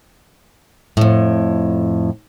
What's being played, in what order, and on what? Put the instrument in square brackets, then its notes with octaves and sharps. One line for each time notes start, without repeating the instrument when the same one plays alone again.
[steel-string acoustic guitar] F2 A2